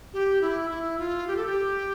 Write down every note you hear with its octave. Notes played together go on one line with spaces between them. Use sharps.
G4
E4
E4
F4
G4
A4
G4